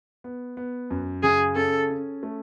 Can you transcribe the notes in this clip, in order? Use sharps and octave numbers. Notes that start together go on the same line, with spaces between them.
B3
B3
F#2
C#3 G#4
C#4 A4
C#4
A3